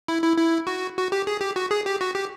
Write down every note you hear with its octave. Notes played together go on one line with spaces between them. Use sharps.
E4
E4
E4
F#4
F#4
G4
G#4
G4
F#4
G#4
G4
F#4
G4